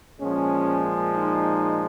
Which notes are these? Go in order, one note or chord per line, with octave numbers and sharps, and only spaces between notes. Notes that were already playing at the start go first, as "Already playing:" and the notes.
A#2 F3 G#3 C#4
D#4